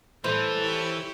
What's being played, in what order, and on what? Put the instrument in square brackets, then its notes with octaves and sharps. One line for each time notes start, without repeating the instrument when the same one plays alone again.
[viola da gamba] A2 G3 [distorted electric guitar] E3 [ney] A4 [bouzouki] B4 C5
[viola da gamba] E4 G4 C#5